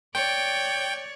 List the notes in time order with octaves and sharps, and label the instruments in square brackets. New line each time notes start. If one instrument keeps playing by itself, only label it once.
[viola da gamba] C#5 D5 [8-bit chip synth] G5